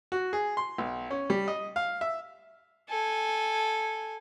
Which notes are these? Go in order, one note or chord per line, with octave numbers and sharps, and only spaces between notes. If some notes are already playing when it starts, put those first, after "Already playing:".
F#4
G#4
C6
B1
C#4
G3
D#5
F5
E5
A4 G#5